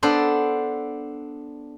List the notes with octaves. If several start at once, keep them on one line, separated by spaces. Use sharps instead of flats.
B3 D4 A4 C5